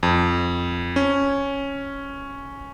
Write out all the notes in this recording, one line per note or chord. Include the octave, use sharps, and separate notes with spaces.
F2
C#4